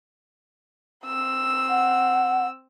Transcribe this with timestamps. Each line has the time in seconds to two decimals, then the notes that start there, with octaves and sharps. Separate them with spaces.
1.06 C4 E6
1.69 F#5